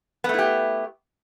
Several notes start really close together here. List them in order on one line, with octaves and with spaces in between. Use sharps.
B3 A3 E4 G4